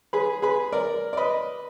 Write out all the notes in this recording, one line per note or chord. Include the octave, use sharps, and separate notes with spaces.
G#4 B4
G#4 B4
A#4 D5
D5
B4 D#5